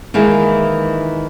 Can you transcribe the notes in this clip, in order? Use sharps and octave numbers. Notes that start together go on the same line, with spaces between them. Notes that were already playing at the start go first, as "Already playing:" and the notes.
D#3 E3 G#3 A#3